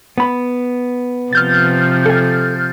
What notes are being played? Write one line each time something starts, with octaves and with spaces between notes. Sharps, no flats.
B3 B5
C3 F3 F6 G6 A6
A4 G#5